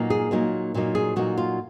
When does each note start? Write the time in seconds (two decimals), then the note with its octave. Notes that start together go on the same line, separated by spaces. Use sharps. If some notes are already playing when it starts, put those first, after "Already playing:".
Already playing: A#2 F#3 A#3 D#4
0.10 G#4
0.31 A#2 F#3 A#3 D#4
0.74 A#2 F#3 A#3 D#4
0.95 G#4
1.16 A#2 F#3 A#3 D#4 F#4
1.37 F4